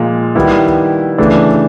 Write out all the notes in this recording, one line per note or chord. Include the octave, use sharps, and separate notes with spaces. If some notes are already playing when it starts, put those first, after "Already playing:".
Already playing: A#2 F3 G#3
D#3 G3 B3 E4 G4
C#3 E3 A3 D4